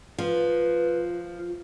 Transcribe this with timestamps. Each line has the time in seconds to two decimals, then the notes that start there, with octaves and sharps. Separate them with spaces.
0.18 F3 B4
1.16 F4